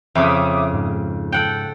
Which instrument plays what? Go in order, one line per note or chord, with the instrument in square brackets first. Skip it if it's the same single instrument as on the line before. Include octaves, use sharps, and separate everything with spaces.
[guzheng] F2 C#3 [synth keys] E5 D6 D#6
[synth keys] G#2
[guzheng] A4 F#5 G5